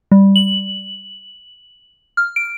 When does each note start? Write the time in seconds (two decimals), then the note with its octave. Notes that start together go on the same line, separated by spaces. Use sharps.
0.12 G3
0.36 F#7
2.17 F6
2.36 D7